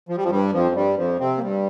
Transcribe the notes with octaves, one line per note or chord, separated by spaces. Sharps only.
F3
G3
F2 F3
G2 G3
F2 F3
G2 G3
F2 F3
C3 C4
A#3
G2 G3